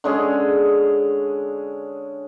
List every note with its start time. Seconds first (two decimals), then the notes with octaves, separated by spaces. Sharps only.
0.04 D3 G#3 C#4 G#4